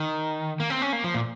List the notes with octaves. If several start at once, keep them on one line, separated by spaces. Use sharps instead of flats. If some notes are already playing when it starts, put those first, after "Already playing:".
Already playing: D#3
A#3
C4
C#4
A#3
F3
A#2